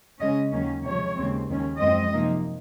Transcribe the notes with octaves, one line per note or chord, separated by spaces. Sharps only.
C#3 G#3 C#4 D#5
D#2 D#3 F#3 A#3 C#4
C3 F3 G#3 C#5
D#2 C#3 G#3 C4
D#2 D#3 G#3 C#4
F#2 F3 G#3 C4 D#5
C3 F3 A#3 D#4